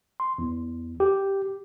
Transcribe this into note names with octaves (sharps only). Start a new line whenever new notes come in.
C6
E2
G4